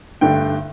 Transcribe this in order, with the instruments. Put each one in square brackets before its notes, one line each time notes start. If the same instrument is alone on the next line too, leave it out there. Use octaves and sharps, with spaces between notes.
[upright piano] G2 D3 A3 G5